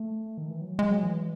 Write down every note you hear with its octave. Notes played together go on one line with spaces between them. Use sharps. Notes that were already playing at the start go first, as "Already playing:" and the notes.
Already playing: A3
D#3
E3
F#3
G#3
F#3
E3